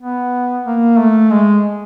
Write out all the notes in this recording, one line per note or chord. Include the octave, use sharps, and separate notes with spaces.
B3
A#3
A3
G#3